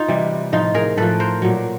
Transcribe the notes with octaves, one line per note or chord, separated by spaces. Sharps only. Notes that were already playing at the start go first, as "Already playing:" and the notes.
Already playing: D#4 F4
C3 E3 G3
A2 F3 D#4 F4
G#4 A#4
A2 F3 A4 B4
A#4 C5
A#2 F#3